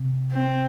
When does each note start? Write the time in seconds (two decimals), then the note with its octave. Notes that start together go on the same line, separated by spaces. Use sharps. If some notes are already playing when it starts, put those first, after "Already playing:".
Already playing: C3
0.32 C4